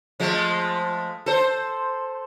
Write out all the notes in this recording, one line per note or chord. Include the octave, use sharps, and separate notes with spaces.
F3 G#3 A3
A4 C5